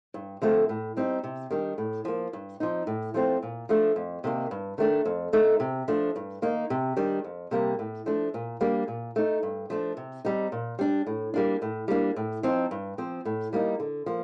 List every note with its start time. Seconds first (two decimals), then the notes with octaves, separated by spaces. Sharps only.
0.14 G2
0.42 D3 F3 A3 C4
0.69 A2
0.97 G3 C4 D#4
1.24 C3
1.51 D#3 G3 D4
1.78 A2
2.05 F3 A#3
2.33 G2
2.60 F3 C4 D#4
2.87 A2
3.14 F3 A3 C4
3.43 A#2
3.69 F3 A3 D4
3.96 F2
4.24 C3 D#3 A#3
4.51 G2
4.78 D#3 A3 D4
5.05 F2
5.33 D3 A3 D#4
5.60 C3
5.88 F3 A3 D4
6.16 G2
6.42 D#3 A#3 D#4
6.70 C3
6.96 D#3 G3 D4
7.24 F2
7.51 C3 G3 A#3
7.79 A2
8.06 F3 A3 D4
8.34 A#2
8.61 G3 A#3 D4
8.88 A#2
9.16 A3 D#4
9.43 G2
9.70 F3 A3 D4
9.97 C3
10.25 G3 C4 D#4
10.52 A#2
10.79 G3 D4
11.07 A2
11.34 G3 A#3 D4
11.62 A2
11.88 G3 A#3 D4
12.16 A2
12.43 F3 C4 D#4
12.71 G2
12.98 F3 C4
13.25 A2
13.53 G3 A#3 D#4
13.80 D3
14.06 F3 A#3